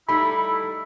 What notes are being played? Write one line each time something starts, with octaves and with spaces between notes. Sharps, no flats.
G3 A3 D#4 E4 B5